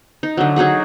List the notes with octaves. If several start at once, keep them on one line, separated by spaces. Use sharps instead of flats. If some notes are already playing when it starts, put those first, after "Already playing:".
D#4
D3 F#3
F#3 D#4 F#4 G#4